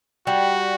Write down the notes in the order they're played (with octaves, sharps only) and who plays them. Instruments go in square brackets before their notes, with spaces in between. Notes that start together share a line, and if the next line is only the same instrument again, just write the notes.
[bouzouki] G3 [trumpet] F#4